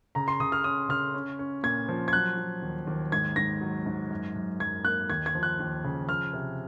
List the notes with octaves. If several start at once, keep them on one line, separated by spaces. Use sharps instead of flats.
C#3 A#5
C6
C#3 D#6
F6
C#4 D#6
C#3 F6
C#4
C#4
A#2 G#6
F3
G#6
F#3 F#6
F#3
D#2
D#2
G#2 G#6
G#2 A#6
F#3
G#2
F#2
F#2
F#2 G#6
A#3 F#6
D#2 G#6
G#6
F3
F#6
D#2
C#3
F3 F6
C3